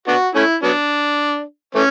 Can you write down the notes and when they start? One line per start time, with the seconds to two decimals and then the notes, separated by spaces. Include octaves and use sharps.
0.08 B3 D4 F#4
0.35 A3 C#4 E4
0.64 F#3 B3 D4
1.75 E3 A3 C#4